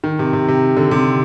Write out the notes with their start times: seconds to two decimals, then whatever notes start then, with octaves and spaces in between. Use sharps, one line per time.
0.04 D#3
0.19 C3
0.33 C3
0.48 C3
0.77 D3
0.91 C3